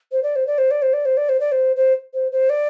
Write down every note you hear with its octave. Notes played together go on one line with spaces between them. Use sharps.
C5
D5
C5
D5
C5
D5
C5
D5
C5
D5
C5
D5
C5
C5
C5
C5
D5